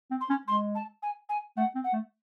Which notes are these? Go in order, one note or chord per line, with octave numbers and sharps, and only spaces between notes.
C4
C6
C#4
G#3 C6
A5
G#5
G#5
A3 F#5
C4
F#5
A3